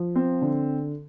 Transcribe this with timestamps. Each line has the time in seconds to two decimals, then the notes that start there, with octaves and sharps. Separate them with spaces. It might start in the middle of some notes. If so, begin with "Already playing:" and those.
Already playing: F3
0.15 C4
0.42 D3